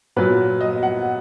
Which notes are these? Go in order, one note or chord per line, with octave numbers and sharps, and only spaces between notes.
A#2 F#3 B4
D#5
F#5